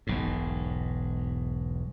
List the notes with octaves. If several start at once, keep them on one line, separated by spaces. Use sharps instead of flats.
E1 B1 G#2